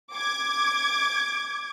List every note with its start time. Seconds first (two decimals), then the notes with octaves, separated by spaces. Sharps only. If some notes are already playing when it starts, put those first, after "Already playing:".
0.14 D6 G#6